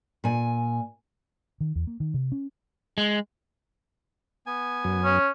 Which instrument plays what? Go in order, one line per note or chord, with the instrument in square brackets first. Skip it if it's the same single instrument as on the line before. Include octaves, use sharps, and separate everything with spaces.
[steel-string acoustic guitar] A#2 G#5
[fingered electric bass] D#3
E2
A#3
D#3
C3
C#4
[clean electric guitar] G#3
[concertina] B3 G#5
[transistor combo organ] F#2
[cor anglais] C#4